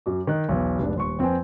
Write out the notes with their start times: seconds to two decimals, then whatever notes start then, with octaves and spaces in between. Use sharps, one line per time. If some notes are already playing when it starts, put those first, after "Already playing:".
0.06 F#2 F#3 D6
0.27 D#3 D#4 A#4 F#6
0.49 B1 E2
0.79 F1 G#2 D4
0.96 D#1 C6 C#6
1.19 F2 C4 B4 G5 G#5